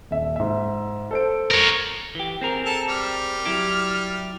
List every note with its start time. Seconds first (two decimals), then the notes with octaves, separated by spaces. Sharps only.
0.11 D#1 E5
0.36 G#2 E5
1.11 A4 C5 D7
1.51 A#4 C#5
2.15 E3 G4
2.41 C4 G#4 A#4
2.66 A4
2.89 G3 F6
3.45 F#3 E4 G4